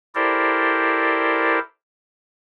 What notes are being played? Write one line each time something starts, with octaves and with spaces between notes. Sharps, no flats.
E4 G4 A4 A#4 C5 D5